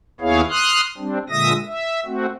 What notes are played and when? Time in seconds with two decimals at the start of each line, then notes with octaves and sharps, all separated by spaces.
0.21 D#2 B3 E4 G#4 C#5 F5
0.50 C6 D#6 F6 F#6
0.98 G3 C4 D4
1.30 A#2 D3 G#3 E5 D#6 A#6
1.66 E5
2.05 A3 C4 F#4